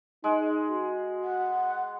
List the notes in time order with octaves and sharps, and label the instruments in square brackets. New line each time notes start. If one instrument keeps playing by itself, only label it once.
[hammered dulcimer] G#3 [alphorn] D#4
[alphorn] F#4
[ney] F#5